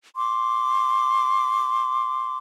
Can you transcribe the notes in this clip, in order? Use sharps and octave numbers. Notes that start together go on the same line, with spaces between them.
C6 D6